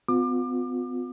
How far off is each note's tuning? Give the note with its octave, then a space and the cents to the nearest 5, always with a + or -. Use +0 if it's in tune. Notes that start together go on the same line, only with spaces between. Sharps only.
B3 +45 F4 +40 D6 +30